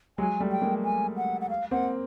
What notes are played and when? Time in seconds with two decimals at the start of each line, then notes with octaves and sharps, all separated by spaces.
0.18 F#3 G#3 G#5
0.40 G3 A3
0.51 G5
0.62 G#3 A#3
0.84 G#5
1.17 F#5
1.41 F#5
1.50 F5
1.71 A#3 C4 F#5